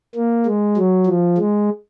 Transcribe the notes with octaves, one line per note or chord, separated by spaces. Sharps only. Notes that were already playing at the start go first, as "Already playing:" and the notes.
A#3
G#3
F#3
F3
G#3